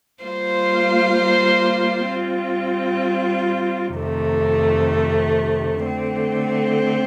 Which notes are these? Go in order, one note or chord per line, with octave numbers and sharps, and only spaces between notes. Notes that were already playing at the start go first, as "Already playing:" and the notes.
G3 A#3 F4 C5 F5
G3 C4 F4
F2 C3 D#3 A3
D3 A3 C4